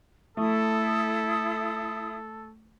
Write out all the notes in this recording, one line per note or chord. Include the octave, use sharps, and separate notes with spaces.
A3 E4 A4 D#6